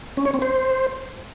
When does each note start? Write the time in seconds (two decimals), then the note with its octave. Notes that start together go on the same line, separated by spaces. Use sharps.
0.17 C#4
0.26 C#5
0.34 C4
0.42 C5